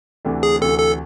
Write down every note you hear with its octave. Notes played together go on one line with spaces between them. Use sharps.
D2 C3 E3 A3 D4
G#4
D2 C3 E3 A3 D4 A4
A4